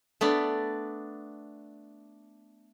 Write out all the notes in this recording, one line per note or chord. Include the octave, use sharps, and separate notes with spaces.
A3 B3 D4 D5